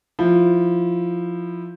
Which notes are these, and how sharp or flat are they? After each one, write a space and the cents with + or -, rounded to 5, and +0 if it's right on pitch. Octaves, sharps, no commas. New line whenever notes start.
F3 +0 E4 +0